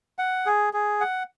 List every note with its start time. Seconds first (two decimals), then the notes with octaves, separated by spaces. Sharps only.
0.19 F#5
0.46 G#4
0.73 G#4
1.01 F#5